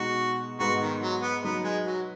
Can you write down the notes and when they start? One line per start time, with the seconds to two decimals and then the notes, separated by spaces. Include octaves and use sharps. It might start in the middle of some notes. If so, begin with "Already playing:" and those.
Already playing: B2 G#3 B3 D#4 F#4
0.59 G#2 G#3 B3 D#4 F#4 B4
0.80 D#3
1.01 F#3
1.22 B3
1.42 F#3 B3 D#4 B4
1.64 G#3
1.85 F#3